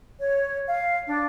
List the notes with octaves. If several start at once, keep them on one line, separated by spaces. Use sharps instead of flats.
C#5
F5
D4